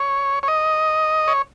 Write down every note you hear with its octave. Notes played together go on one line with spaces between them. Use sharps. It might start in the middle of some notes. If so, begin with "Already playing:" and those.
Already playing: C#5
C#5
D#5
C#5